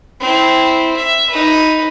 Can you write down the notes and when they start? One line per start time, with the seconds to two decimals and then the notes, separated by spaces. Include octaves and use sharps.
0.20 C4 E4
0.96 E5
1.29 D#4 B4